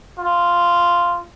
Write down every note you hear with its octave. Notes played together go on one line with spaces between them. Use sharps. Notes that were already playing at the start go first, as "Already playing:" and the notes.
F4